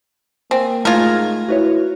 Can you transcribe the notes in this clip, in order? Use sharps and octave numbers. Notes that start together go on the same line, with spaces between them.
A#3 C4 G#5
G#2 A3 F4 A#4 G#6
E4 F#4 B4 C#5